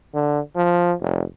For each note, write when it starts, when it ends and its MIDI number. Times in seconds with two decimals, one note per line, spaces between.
0.14 0.40 50
0.56 0.93 53
1.01 1.23 29